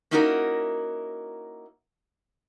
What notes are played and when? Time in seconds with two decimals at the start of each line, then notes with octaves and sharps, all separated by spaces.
0.11 A#3 C#4 D#4 E4 F#4 A#4